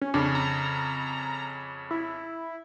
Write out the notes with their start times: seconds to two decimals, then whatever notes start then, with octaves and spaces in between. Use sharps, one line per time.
0.02 C#4
0.14 F2 C#3 D4
0.35 A#5
1.91 E4